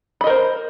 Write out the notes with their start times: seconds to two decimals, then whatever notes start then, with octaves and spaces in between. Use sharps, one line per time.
0.21 B5
0.24 D#5
0.27 A#4
0.30 C5